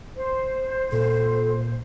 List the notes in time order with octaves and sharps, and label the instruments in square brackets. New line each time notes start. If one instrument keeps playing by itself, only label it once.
[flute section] C5
[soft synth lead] A#2 [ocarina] A4